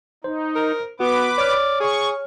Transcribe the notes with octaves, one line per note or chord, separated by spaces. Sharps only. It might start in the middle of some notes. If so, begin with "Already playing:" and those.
D#4 C5
A#4
B3 F#4 B4 D6
C#5 D5 F6
G#4 C#6